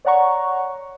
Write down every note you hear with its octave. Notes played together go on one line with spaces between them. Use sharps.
C#5 D5 F#5 A#5 C#6